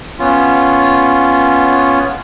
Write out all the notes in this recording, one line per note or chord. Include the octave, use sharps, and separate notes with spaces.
B3 C#4 F4